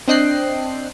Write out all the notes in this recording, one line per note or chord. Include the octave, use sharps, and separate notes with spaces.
C4 D4 D#5 G5 F#6 C7